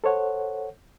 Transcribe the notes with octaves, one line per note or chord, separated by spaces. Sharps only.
A4 C5 C#5 F#5